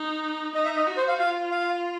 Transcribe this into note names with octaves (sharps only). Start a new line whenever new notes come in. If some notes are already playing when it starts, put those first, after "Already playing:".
Already playing: D#4
D#4 D#5
E5
D#5
F#4
C5
F5
F4 F5
F5